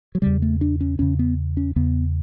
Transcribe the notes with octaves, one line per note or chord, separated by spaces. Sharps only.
F#3
E2 C#3 G3
A3
D4
C#4
E2 C#3 C#4
B3
C#4
E2 C#3 B3